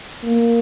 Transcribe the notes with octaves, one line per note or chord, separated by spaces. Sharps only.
A#3